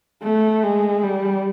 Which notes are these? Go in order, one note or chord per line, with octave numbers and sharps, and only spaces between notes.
A3
G#3
G3